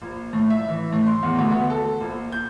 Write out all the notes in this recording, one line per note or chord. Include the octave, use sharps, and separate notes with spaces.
A#1
A2
E5
E3
A2
C6
E2
D2
B3
A4
A#1
G6